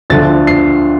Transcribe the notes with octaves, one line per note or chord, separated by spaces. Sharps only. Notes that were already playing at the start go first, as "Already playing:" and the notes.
D2 D3 F3 A6
C7